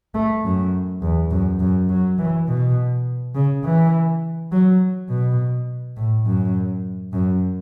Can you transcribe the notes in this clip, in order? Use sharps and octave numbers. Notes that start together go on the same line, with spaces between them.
A3
F#2
E2
F#2
F#2
F#3
E3
B2
C#3
E3
F#3
B2
A2
F#2
F#2